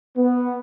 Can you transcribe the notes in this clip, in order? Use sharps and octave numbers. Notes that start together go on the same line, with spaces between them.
B3